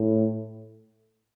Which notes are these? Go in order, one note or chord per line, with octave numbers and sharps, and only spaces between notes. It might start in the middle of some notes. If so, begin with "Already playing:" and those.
Already playing: A2